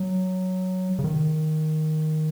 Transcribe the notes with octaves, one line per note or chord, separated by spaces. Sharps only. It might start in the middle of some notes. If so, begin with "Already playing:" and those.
Already playing: F#3
C#3
D#3